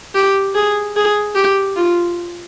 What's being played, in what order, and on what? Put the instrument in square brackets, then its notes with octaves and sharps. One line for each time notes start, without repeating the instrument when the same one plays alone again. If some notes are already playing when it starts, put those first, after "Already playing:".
[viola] G4
G#4
G#4
G4
F4